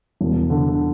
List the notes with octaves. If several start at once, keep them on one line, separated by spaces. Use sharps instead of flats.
E1
D3